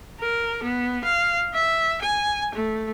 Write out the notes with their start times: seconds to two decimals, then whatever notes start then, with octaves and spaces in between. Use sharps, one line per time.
0.20 A#4
0.63 B3
1.04 F5
1.53 E5
2.01 G#5
2.54 A3